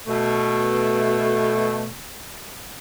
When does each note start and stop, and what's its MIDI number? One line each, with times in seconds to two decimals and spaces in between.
0.07 1.93 47
0.07 1.93 57